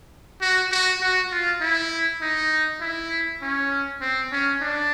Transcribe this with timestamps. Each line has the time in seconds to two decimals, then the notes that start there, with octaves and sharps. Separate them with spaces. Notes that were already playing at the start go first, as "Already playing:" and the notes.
0.41 F#4
0.72 F#4
1.01 F#4
1.32 F4
1.61 E4
2.22 D#4
2.81 E4
3.42 C#4
4.01 C4
4.32 C#4
4.61 D4